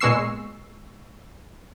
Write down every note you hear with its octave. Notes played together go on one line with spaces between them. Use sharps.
A#2 G#3 B3 C#6 E6 C7